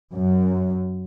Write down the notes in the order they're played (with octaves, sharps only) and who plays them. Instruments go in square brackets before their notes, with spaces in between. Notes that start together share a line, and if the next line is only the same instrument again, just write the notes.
[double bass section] F#2